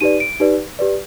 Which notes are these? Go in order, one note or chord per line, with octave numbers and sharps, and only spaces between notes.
D#4 G4 B4 D5 D#7
D7
D#4 G4 B4 D5
G4 B4 D5